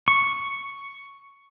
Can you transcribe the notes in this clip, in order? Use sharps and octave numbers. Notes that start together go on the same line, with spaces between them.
C#6